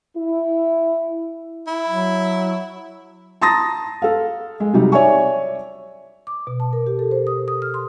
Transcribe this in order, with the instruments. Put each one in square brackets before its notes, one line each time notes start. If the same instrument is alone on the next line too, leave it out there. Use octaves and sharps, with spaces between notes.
[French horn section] E4
[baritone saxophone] E4
[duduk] F#3
[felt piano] A5 A#5 C6 D#6 A6 A#6
A4 F5
G#3
C3 F#3 G3 D#4
C#5 D5 E5 G#5 C#6
[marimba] D6
B2
A5
A#4
G4
A4
C5
D#6
D#6
F6
C6